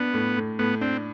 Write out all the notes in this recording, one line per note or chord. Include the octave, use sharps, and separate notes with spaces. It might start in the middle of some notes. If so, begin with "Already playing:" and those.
Already playing: B3 D4
A2
A2
A2 B3
C4 D4